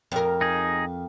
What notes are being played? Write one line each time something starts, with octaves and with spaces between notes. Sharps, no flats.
F2 A#4
D#4 G#4